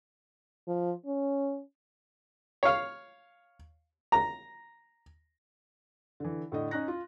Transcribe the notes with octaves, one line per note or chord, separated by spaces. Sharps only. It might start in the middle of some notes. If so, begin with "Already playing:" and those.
F3
C#4
C#5 F5
A#5
D3 E3
A2 D3 D#5
C#4 D#4 F#6 A#6
F4